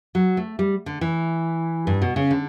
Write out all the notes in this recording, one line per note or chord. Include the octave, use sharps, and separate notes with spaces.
F#3
A3
G3
D3
E3
G2
B2
C#3
D3